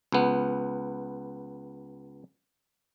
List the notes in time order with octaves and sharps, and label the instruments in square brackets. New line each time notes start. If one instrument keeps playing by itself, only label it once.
[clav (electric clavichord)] C#2 B3